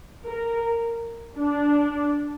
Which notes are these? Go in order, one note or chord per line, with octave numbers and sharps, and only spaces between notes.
A#4
D4